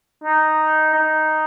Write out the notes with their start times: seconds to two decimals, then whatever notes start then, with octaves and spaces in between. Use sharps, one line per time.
0.24 D#4
0.94 D#4